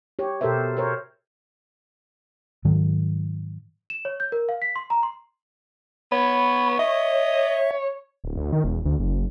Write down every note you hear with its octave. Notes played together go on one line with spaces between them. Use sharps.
G4 C#5
B2 G4 A4 A#4 C5 E5
A#4 C5 C#5
G#2 D#3 F#3
E7
C#5
G6
A#4
F5
B6
C6
A#5
C6
B3 C#5 B5
D#5 E5
D1
D2
D#3
E1
D2
F#1